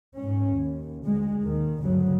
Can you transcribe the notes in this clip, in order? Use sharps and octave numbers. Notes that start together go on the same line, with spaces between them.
G#2 C#4
D#2
D2 G#3
D#2 D#3
G1 D2 C#3 F#3